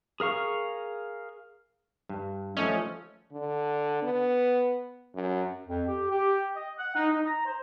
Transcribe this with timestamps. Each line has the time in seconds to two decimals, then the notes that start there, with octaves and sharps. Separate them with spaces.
0.20 G#4 A#4 F5 C#6
2.09 G2
2.57 F3 A3 C#4 D#5
3.32 D3
4.03 B3
5.15 F#2
5.68 F2
5.88 G4
6.11 G4
6.56 D#5
6.78 F#5
6.96 D#4
7.12 D#4
7.26 A#5
7.46 C5